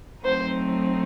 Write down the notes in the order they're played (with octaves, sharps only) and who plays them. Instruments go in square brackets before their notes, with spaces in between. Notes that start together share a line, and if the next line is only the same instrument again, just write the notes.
[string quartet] F#3 A3 C4 D#4 [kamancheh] C5